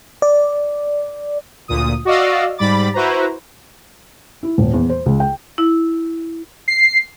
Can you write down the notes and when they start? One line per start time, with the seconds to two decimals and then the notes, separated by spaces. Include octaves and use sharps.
0.22 D5
1.68 D2 A#2 D#6
2.05 F#4 D5 D#5 F5 E6
2.58 G#2 G3 B5 D6 A6
2.94 E4 F#4 B4 C5 A#5
4.43 E4
4.58 D#1
4.73 E2
4.90 C5
5.06 C#2
5.20 G5
5.58 E4
6.68 C7